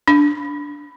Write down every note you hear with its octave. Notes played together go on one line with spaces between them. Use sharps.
D4